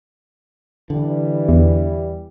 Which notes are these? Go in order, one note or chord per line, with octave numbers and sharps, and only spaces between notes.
D3 E3 G3
E2